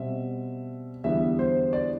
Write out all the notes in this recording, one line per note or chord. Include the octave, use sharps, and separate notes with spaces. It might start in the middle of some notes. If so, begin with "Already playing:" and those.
Already playing: B2 G3 C4 E5
E2 D3 G3 B3 E5
C5
D5